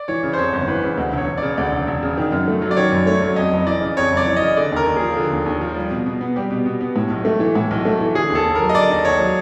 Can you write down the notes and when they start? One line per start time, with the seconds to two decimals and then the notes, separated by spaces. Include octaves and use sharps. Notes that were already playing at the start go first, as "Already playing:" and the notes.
Already playing: D5
0.08 E3 C#5
0.23 C#3
0.33 C5
0.38 F2 C#5
0.53 G1
0.67 E3 B4
0.83 C#3
0.97 D2
1.13 E1 C#5
1.27 E1
1.38 C#3 D5
1.57 D2 D5
1.72 E1
1.88 E1
2.03 C#3
2.18 D#3
2.32 F#2
2.48 A3
2.62 F#3
2.71 D5
2.77 D#3 C#5
2.92 F#2
3.06 A3 C#5
3.22 F#3
3.36 F2 D#5
3.52 F#1
3.67 E3 D5
3.81 C#3
3.97 F2 C#5
4.12 F#1
4.17 D5
4.27 E3
4.36 D#5
4.42 C#3
4.57 D3 D5
4.71 D#2
4.76 A#4
4.86 D#2
4.97 F3 G#4
5.17 D3
5.32 D#2
5.46 D#2
5.61 F3
5.76 G3
5.90 B2
6.06 B2
6.21 B3
6.36 G3 G4
6.51 B2
6.66 B2
6.81 B3
6.96 A2
7.11 B1
7.25 A3
7.40 E3
7.55 A2
7.71 B1
7.85 A3
8.01 E3
8.15 D3 G#4
8.30 D#2
8.35 A4
8.45 D#2
8.55 F#3 A#4
8.69 D#5
8.75 D3 D5
8.89 D#2
9.05 D#2 C#5
9.19 F#3